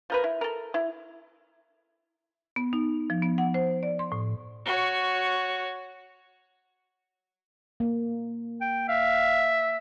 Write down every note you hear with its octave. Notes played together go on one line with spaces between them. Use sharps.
F3 A#4 B4
E4
A4 A#4
E4
B3
D#4
F3
B3
F#5
C5
D5
C6
A2
F#4 C#5
A#3
G5
E5 F5